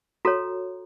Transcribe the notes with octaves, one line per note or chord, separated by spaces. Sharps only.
F#4 A4 C#5 A#5